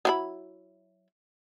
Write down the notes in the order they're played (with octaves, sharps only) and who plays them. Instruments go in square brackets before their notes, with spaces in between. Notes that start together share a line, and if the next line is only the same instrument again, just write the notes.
[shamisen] F#3 E4 B5